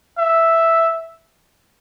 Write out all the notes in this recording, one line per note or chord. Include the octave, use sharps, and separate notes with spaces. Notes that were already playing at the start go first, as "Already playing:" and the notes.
E5